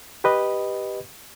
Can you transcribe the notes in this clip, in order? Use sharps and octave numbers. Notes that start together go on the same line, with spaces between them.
G4 B4 D#5